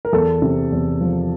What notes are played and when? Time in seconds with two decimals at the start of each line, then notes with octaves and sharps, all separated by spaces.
0.05 A#4
0.13 E2 A4
0.42 C3
0.72 E2
1.01 F3